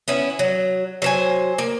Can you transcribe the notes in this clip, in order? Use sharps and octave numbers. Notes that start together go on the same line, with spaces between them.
B3 C#4 E4
F#3
F#3 C5 G#5
A#3